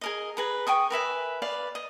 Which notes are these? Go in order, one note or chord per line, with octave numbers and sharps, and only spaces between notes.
G#4 A#4 D#5
G#4 B4 A#5
G5 G#5 C#6 D#6
A#4 B4 E5 G#5
B4 D5 F5
D#5